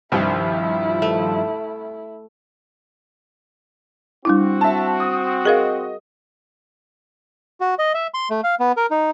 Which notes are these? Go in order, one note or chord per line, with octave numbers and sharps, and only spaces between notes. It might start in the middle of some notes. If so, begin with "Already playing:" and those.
C2 G2 D#3 F3 E4
A3
G3 C4 D4 E4 F#4
E5 A5
D#6
G#4 A#4 D#5 F5
F#4
D#5
E5
C6
A3
F5
B3
A#4
D#4